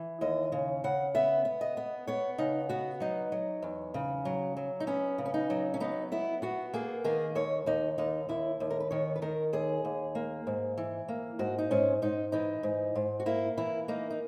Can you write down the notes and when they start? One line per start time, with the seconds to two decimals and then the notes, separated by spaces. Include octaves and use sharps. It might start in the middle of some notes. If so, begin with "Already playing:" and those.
Already playing: E3
0.21 D#2 D#5
0.52 C#3
0.84 C#3 F#5
1.15 B3 E5
1.45 B3
1.61 D#5
1.77 B3
2.07 B3 C#5
2.38 C#3 D#4
2.69 B3 F#4
3.00 F#3 D#4
3.32 F#3
3.62 E2
3.94 C#3
4.25 F#3
4.57 F#3
4.80 D#4
4.87 B3 C#4
5.18 C#3
5.26 C#4
5.34 D#4
5.50 F#3
5.74 C#4
5.80 B3 D#4
6.12 B3 E4
6.42 B3 F#4
6.74 A#3 G#4
7.04 D#3 G#4
7.35 D#2 C#5
7.66 D#2 D#4
7.98 D#2 D#4
8.29 D#2 E4
8.60 D#2
8.70 A#4
8.80 B4
8.91 D#3 C#5
9.16 B4
9.22 D#3 A#4
9.53 D#2 G#4
9.85 D#2
10.15 A#3
10.47 G#2
10.78 E3
11.09 A#3
11.39 G#2 F#4
11.58 D#4
11.71 G#2 C#4
12.02 G#2 D#4
12.32 E3 D#4
12.63 G#2
12.95 G#2
13.20 F#4
13.26 A#3 E4
13.57 E3 E4
13.88 A#3 D#4
14.10 D#4